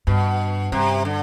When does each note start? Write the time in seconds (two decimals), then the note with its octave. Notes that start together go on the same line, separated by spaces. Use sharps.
0.07 G2 B2
0.72 G2 C3
1.05 D3